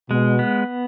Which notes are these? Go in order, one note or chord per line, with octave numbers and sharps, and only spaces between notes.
B2 G#3
B3